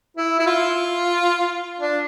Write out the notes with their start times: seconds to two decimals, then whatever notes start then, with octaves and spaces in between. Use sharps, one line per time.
0.17 E4
0.39 E4
0.46 F4
1.80 D4